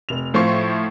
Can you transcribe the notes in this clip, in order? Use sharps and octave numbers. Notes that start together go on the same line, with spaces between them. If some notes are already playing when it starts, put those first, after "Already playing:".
F1 F7
A2 F3 C6 C#6 C7